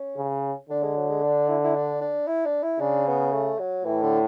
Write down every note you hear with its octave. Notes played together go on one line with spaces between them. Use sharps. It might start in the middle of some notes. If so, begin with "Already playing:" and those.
Already playing: C#4
C#3
D3 D4
G#3
F#3
G#3
D4
E4
E4
D4
D4
E4
D4
E4
C#3 D4
B3
A3
F#3
A2 E3
D3